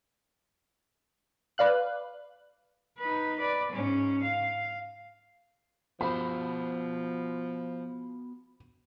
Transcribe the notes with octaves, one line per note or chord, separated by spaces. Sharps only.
B4 D5 F5 F#6
D#4 B4
B4 D5
G#2 C#4
F5
F3 B3 F#4 C5 B5